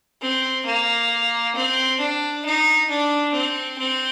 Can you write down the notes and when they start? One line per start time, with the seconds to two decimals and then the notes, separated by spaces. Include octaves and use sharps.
0.22 C4
0.66 A#3
1.56 C4
2.00 D4
2.45 D#4
2.90 D4
3.34 C4
3.78 C4